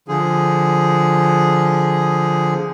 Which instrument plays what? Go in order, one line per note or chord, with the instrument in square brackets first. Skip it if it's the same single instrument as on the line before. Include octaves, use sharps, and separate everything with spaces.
[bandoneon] D3 F3 G#4